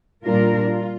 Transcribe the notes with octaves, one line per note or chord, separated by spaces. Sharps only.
A#2 G3 D4 F4 A#4
F4